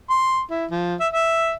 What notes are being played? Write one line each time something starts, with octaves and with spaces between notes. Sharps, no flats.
C6
E4
F3
E5
E5